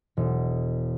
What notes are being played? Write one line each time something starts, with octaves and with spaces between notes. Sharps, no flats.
E1